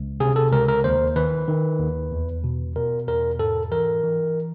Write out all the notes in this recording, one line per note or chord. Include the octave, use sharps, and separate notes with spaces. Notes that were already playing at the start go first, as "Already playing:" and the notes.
Already playing: C#2
C3 G#4
A4
C#2 A#4
A#4
D#2 C5
D#3 B4
D#3
D#2
E2
B2
B2 A#4
E2 A#4
G#2 A4
E3 A#4
E3